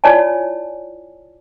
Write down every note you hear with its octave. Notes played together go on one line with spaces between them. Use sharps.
E4 F4 C#5 D5 G#5 A5